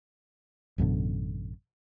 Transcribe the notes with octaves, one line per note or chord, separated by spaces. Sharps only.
A1 F#2 B2 D3